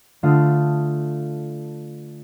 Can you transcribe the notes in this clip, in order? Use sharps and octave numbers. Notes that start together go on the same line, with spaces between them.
D3 A3 F4 F5 A5 D#6